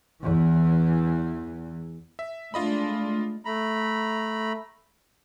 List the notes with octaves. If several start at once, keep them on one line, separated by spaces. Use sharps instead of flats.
E2 E3
E5
G#3 A3 D4 F4 D#5 B5
A3 A#5 B5